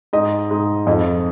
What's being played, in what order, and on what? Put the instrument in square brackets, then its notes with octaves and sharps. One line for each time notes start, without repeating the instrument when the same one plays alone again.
[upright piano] G#2 D#5
G#2
F2 D#5